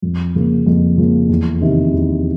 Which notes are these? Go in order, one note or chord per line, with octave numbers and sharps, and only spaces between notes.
F2
C#3 F3 A#3
F2
C#3 F3 A#3
E2
C3 D#3
E2